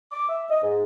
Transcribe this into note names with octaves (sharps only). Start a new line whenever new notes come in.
D6
E5
D#5
G#2